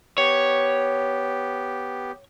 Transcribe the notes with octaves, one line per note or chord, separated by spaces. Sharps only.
B3 G4 C#5